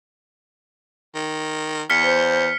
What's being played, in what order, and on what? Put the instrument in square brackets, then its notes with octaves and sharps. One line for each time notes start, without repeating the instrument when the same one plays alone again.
[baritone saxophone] D#3
[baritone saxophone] E2 [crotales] F6 B6 C#7
[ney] C5